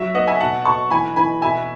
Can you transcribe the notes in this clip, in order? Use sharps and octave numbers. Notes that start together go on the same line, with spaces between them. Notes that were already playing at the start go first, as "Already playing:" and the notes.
Already playing: F#3 E5
B3 D#5 F#5
E5 G#5
B2 F#5 A5
B2 A5 C#6
E3 G#5 B5
E3 G#5 B5
B2 E5 G#5